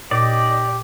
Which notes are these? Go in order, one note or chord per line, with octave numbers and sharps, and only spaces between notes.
A#2 C#4 D#4 G4 D5 D#5